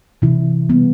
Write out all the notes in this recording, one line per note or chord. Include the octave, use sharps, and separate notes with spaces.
C3 E3 E4
E3 G3 B3